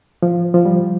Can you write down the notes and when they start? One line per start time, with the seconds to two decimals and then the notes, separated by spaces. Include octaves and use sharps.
0.22 F3
0.54 F3
0.65 G3